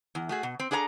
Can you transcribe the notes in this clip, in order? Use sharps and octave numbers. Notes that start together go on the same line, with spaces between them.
E2
A3 F#4 G#4
B2
C4
D4 G#4 A4 E5 A#5